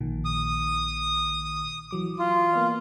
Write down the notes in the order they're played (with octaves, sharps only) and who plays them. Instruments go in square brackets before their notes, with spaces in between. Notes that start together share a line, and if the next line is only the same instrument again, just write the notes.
[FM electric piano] A#1 A#2 D#3
[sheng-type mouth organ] D#6
[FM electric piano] E3 F#3 D6
[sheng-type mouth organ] F4
[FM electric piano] A#3 B3 D5